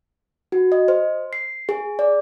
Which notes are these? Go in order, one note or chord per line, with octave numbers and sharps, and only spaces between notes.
F#4
D#5
C5
C7
G#4
D5